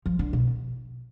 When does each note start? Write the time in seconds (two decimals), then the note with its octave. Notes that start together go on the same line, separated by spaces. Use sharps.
0.06 F3
0.19 D3
0.33 B2